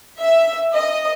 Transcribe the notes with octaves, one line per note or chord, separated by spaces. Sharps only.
E5
D#5